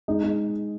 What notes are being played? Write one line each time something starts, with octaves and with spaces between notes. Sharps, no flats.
G#3 D#4
G#3